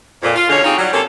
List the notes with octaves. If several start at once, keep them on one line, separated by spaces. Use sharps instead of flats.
F2 A#2
F4
B2 D3 G#3 C#4 C#5 F5
C4 D#4 F4 G4 G#4 C#5
F#3 G3
C3 A#3 C#4 A4